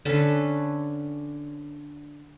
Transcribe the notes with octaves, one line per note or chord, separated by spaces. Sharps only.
D3 C#4 A4 B4